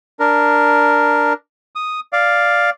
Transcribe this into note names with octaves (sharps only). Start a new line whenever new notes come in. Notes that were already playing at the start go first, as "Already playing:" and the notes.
D4 A#4
D#6
D5 F5